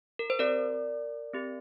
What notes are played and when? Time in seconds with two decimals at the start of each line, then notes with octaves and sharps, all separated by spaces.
0.19 A#4
0.30 C5
0.39 C4 G4 A#4 D5
1.33 C4 G4